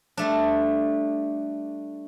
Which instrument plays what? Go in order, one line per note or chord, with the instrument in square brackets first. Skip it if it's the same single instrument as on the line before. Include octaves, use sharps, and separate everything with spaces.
[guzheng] G3 A3 D4